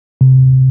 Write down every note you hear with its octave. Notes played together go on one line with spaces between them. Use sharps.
C3